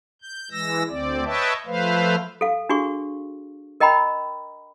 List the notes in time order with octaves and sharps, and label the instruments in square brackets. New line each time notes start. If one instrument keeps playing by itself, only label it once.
[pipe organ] G6
E3 G#3 E6 A#6
D2 C4 D5
B4 C#5 D#5 E5 G5 A5
F3 A3 B4 C5 F5
[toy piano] A4 F5
D4 F#4 G#4 C#6
A#4 D#5 G5 A#5 B5